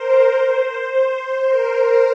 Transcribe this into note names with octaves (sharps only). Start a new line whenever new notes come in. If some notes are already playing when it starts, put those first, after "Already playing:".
Already playing: A#4 C5
C5
A#4